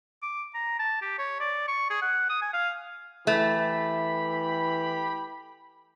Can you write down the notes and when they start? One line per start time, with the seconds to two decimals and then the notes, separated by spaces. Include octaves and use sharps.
0.23 D6
0.54 A#5
0.79 A5
1.02 G4
1.19 C#5
1.40 D5
1.68 C#6
1.90 G#4
2.02 F#5
2.30 D#6
2.42 G#5
2.54 F5
3.27 E3 A3 G4 B5